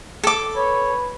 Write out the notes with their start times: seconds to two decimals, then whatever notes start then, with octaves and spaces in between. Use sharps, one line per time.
0.24 A4 D6
0.56 B4 C#5